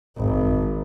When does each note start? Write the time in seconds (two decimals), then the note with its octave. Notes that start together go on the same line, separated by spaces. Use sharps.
0.17 G#1